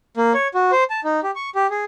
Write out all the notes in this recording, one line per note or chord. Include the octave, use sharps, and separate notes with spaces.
A#3
C#5
F#4
C5
A5
D#4
G4
C#6
G4
G#4